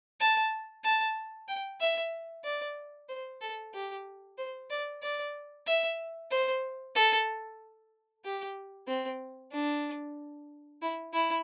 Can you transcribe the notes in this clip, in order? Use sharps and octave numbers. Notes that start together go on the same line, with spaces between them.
A5
A5
G5
E5
D5
C5
A4
G4
C5
D5
D5
E5
C5
A4
G4
C4
D4
E4
E4